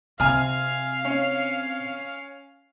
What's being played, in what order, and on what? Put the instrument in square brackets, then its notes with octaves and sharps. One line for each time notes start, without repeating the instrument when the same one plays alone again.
[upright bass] C3 [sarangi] F5 [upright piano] G#5 F6
[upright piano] C#4